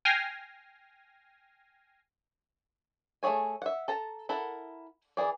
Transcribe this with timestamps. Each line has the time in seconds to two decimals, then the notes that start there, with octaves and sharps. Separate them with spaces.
0.05 G5 G#5 F6 A#6 C7
3.23 A3 F4 G#4 C#5 G#5
3.62 E5 F#5
3.88 A4 A5 A#5
4.29 E4 A4 A#4 F#5
5.17 E3 G#4 D5